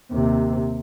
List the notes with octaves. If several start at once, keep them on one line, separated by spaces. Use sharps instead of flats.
D#2 C3